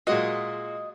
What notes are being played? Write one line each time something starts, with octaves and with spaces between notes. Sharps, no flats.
A#2 G#3 F#4 D#5